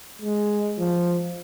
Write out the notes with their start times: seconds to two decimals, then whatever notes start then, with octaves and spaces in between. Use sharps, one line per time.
0.22 G#3
0.78 F3